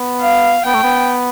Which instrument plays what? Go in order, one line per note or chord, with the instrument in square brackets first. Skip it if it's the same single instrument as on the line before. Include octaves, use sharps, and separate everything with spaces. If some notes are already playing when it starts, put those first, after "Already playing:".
Already playing: [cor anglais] B3
[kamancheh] F5
[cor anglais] B3 [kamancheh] G5
[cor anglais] A3
B3